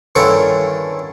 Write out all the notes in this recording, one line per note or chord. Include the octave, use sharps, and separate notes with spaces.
G2 D3 D#3 C#4 E4 C#6